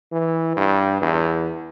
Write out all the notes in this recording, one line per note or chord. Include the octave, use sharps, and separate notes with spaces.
E3
G2
E2